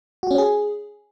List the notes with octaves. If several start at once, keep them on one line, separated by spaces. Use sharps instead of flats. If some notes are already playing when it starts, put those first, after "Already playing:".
F#4
C#4
G#4